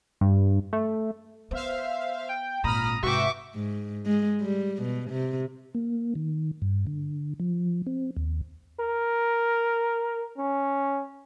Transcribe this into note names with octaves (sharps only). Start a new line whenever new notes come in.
G2
A3
B3 C5 E5 F5
G5
G#1 A#2 A#5 B5 D#6 F6
G#2 C3 F#4 B4 E5 G5 C#6 D6
G#2
G#3
G3
B2
C3
A#3
D#3
G2
D3
F3
C4
D#2
A#4
C#4